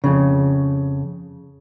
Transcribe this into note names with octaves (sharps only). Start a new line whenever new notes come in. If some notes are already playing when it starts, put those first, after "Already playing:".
F2 C#3